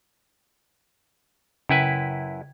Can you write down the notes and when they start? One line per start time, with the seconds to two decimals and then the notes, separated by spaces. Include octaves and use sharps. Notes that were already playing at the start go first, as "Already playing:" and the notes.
1.69 F#2 C#3 E4 B4 G5 G#6